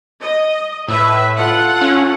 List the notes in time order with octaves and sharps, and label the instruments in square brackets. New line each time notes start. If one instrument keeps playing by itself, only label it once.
[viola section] D#5
[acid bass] A2 [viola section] B4 E5
[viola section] F4 A4 F#5
[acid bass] C#4